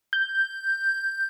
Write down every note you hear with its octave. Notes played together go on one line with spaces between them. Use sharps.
G6